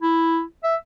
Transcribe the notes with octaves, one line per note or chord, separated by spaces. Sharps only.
E4
E5